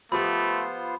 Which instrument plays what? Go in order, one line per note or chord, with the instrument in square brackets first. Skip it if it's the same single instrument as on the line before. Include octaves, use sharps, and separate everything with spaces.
[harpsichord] F3 G4 [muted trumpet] A3 [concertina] B3 F4 C5 [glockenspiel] B5